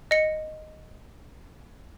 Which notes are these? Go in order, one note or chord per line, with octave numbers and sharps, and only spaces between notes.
D#5 C#7